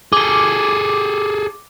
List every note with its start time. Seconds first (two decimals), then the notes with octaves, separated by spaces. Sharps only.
0.13 G#4 A4 D6